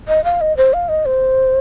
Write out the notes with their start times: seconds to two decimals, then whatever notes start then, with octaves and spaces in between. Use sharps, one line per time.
0.08 D#5
0.24 F5
0.41 D#5
0.57 C5
0.74 F5
0.89 D#5
1.06 C5